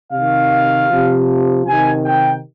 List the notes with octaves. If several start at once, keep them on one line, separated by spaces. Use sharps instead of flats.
C3 D#3 F5
C3 F3
C3 D#3 G#5
G5